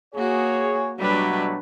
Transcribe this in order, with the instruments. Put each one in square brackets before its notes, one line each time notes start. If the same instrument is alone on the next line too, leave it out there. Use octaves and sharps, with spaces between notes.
[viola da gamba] A#3 F#4 [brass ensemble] G#4 C#5
[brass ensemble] B2 F#3 A3 [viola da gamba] G3 D4 B4